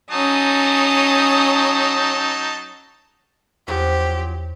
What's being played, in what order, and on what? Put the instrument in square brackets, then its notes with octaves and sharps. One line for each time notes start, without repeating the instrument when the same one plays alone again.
[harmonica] F#3 D#4 A5 [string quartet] C#4 D#6
[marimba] E2 [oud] F3 F#3 C#4 [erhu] G4